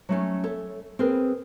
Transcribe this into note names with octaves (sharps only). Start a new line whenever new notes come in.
F#3 A3 C#4
A4 C#5 E5
C4 G#4 A#4 B4